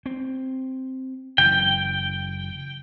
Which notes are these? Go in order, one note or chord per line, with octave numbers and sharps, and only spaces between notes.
C4
F#1 E3 G5